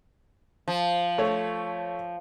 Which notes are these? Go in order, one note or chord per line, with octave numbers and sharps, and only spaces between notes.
F3
A3 C#5